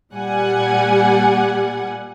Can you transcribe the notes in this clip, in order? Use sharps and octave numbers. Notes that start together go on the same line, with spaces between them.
A#2 G3 F#5 G#5